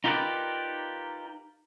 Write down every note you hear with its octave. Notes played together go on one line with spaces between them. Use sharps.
D#4 F4 G4 A#4 B4 D5